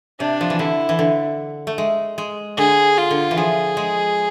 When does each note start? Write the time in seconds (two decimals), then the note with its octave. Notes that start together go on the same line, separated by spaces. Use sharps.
0.20 C3 D4
0.41 F3
0.50 E3
0.59 D3 E4
0.89 E3
0.99 D3
1.67 A3
1.78 G#3
2.18 G#3
2.58 D3 G#4
2.98 F4
3.11 D3
3.31 E3
3.37 F3 G#4
3.77 G#3